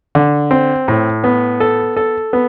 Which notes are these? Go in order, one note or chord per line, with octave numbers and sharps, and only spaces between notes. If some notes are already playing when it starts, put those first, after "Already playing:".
D3
C4
A2
B3
A4
A4
B3